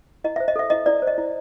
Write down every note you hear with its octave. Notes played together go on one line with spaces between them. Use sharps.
E4 D#5
C5 E5
D#5
A4 E5
E4 D#5
E4 D5
C5
D#5
E4